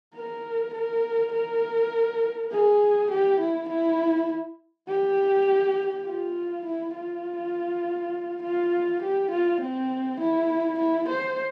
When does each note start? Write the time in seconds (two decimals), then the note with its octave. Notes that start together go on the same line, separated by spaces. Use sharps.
0.15 A#4
0.74 A#4
1.33 A#4
2.52 G#4
3.10 G4
3.40 E4
3.69 E4
4.87 G4
6.06 F4
6.65 E4
6.95 F4
8.43 F4
9.02 G4
9.31 F4
9.61 C4
10.20 E4
10.79 E4
11.09 C5